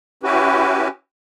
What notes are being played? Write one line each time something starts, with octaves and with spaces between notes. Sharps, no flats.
C#4 E4 F#4 G4 B4